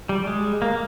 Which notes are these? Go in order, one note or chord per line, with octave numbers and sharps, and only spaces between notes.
G3
G#3
A#3